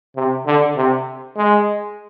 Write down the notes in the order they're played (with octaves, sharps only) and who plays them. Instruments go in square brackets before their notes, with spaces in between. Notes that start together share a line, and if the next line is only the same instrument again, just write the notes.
[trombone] C3
D3
C3
G#3